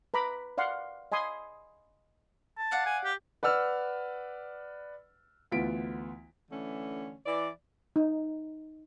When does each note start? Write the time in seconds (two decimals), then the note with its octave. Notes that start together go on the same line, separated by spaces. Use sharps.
0.14 B4 A#5 B5 D6
0.58 D5 F5 F#5 C6
1.12 D#5 G#5 B5 C6 D#6
2.57 A5
2.71 D5 F5 F#5
2.86 G#5
3.04 G4
3.43 B4 D5 F#5 E6 F6
5.52 D2 E3 B3 F4 B6 D7
6.50 D3 E3 A3 C#4
7.26 E3 D5
7.96 D#4